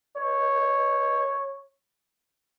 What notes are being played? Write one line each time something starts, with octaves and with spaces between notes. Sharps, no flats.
C#5